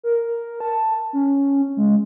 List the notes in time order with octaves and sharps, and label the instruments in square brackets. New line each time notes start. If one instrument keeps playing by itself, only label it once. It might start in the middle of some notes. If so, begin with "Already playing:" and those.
[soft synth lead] A#4
A5
C#4
G#3